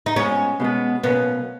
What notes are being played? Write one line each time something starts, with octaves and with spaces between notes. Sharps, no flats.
D#4
A#2 G#3 B3 C#4
B2 G#3 B3
B1 B2 A#3 B3 C#4